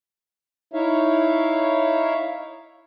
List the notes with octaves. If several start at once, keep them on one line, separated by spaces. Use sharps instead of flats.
D#4 E4 C#5 E5 F5